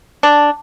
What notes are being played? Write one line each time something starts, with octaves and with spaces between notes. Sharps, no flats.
D4